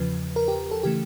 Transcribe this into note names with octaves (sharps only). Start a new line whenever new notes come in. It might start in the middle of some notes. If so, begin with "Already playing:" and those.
Already playing: E2 C#3 F3 B4
A#4
G4
A4
C#3 E3 A3 G4